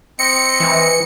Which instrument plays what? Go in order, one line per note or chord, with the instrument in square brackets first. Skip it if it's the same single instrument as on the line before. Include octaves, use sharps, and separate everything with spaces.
[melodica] C4 D#5 [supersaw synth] C#7
[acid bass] E3